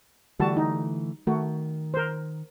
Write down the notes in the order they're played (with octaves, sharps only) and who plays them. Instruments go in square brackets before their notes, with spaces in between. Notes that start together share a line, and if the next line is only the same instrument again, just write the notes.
[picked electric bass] D3 E3 A3 [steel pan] G3 F#4 A5
[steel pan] D#4
[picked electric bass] D#3 [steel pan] A3 F#4
[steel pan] A#4 C5